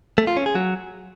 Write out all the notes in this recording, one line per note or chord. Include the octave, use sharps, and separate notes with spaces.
A3
F4
C#4
G#4
F#3